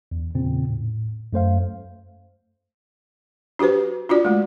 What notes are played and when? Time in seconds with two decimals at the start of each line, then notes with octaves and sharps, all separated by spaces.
0.12 E2
0.35 E2 A#2 C#3 C4
0.69 A2
1.33 F#2 A3 C5 F5
3.59 D4 F#4 G4 B4 C5
4.09 D4 F4 F#4 D5
4.25 G#3 A3